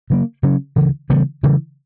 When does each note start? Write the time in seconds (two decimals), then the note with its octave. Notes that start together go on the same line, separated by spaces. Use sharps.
0.10 C#3 F#3 A#3
0.43 C#3 F#3 C#4
0.76 D2 C#3 E3
1.10 C#3 E3 G3 B3
1.43 C#3 E3 G3